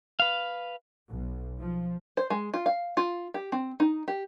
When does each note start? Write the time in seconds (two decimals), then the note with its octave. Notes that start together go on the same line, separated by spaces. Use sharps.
0.20 B4 F5
1.10 B1
1.60 F3
2.17 C5
2.30 G#3
2.54 F4
2.66 F5
2.97 F4
3.34 G4
3.52 C4
3.80 D#4
4.08 G4